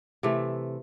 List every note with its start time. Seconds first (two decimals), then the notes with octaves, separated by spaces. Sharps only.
0.23 C3 E3 A3